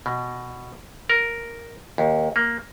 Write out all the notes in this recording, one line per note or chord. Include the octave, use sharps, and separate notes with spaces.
B2
A#4
D#2
A#3